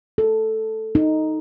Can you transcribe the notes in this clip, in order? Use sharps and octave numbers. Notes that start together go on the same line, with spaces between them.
A4
D#4